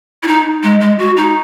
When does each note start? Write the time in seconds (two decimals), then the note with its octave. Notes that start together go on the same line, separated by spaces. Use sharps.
0.23 E4
0.27 D#4
0.63 G#3
0.81 G#3
0.99 F#4
1.17 D#4